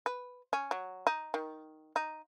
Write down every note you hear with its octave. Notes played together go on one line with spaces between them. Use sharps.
B4
C#4
F#3
D#4
D#3
D#4